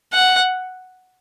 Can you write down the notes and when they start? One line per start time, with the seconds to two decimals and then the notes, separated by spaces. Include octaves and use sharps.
0.13 F#5